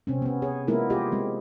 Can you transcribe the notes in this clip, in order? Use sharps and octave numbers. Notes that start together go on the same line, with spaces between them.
C3 C4 C#4
B3 C#4
G#4 C#5
G#3 A#3 B3 E4 F4 A#4
F4 G4 G#4 D#5
G#3 C4